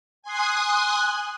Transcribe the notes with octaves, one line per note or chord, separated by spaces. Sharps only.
G#5 C6 D#6 F#6